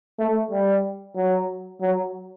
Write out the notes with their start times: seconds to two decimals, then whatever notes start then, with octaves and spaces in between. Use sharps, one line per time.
0.19 A3
0.51 G3
1.16 F#3
1.81 F#3